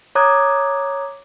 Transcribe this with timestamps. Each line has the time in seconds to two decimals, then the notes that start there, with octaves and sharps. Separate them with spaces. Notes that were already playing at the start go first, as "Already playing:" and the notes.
0.15 C#5 A#5 D6 D#6 F#6 G#6